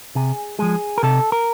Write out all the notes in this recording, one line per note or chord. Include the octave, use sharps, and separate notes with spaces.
C3 G#4
F3 G#3 G#4
A#4
C3 A4
A#4